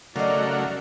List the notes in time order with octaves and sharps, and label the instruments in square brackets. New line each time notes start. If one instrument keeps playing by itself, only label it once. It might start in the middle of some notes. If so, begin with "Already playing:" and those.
[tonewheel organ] C#3 [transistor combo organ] F#3 A3 A#4 [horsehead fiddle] D5 F#5 [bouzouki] D#5 F5